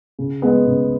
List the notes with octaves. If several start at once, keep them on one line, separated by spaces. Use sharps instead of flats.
C#3
G#3 B3
C#3